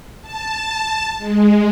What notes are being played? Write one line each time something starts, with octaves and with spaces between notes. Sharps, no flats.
A5
G#3